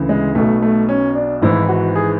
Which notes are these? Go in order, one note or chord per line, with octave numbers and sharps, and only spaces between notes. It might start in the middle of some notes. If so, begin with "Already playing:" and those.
Already playing: D2 C#3 E3
G#3
B1 B2 A3
A3
C#4
D4
G#1 G#2 E3 E4
F#4
G#4